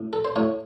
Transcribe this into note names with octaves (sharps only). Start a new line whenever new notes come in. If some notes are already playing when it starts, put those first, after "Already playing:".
Already playing: A2
A4
C5
A2 C#5